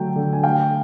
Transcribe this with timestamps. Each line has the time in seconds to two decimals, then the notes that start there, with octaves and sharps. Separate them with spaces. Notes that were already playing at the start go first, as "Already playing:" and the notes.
Already playing: D3 F#3 A3 G5
0.16 D3
0.33 G#5
0.44 A3 F5 G5